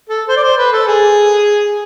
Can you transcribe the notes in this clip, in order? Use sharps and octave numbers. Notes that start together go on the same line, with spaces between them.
A4
C5
D5
C5
B4
A4
G#4